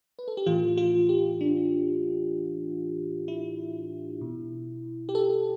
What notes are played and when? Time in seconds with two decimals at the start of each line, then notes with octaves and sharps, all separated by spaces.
0.19 B4
0.28 A4
0.37 G4
0.46 A2 E3 F4
0.77 F4
1.09 G4
1.41 D4
3.28 E4
4.21 B2
5.09 G4
5.15 A4